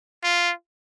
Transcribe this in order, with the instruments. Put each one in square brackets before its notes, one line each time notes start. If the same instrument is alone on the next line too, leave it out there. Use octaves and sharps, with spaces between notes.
[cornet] F4